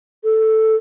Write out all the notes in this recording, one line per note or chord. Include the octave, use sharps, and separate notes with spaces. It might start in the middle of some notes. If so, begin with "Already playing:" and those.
A4